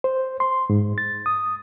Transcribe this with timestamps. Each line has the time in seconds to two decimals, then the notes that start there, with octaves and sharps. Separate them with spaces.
0.04 C5
0.40 C6
0.70 G#2
0.98 A6
1.26 D#6